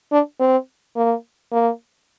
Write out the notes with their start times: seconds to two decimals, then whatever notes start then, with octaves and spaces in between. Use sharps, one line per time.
0.12 D4
0.40 C4
0.96 A#3
1.52 A#3